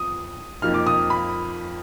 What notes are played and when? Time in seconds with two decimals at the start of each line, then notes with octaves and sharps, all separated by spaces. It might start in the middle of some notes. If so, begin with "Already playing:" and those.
Already playing: F2 F3 B3 D#6
0.62 F2 F3 A#3 D#4 F6
0.74 D6
0.87 D#6
1.10 B5